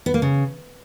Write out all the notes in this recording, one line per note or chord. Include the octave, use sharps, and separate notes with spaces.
B3
A#3
C#3